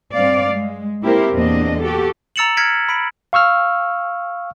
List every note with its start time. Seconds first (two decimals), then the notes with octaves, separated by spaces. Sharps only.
0.14 G2 C4 D5 F5
0.49 G#3
1.02 A#3 C4 E4 G4 A#4 C5
1.34 E2 A#2 A#3 C4 D4 D#5
1.81 F#4 G4 A4
2.36 A#5 E6 A6 C#7 E7 F#7
2.57 F6 G#6 A#6 B6 C#7 D7
2.89 B5 B6 D7
3.33 F5 C#6 E6 F6